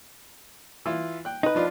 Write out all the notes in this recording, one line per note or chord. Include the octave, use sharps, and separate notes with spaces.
E3 E4 F4
G5 F#6
D#4 B4
F3 D4 F4